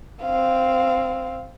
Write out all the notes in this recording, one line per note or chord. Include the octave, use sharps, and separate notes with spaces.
C4 F5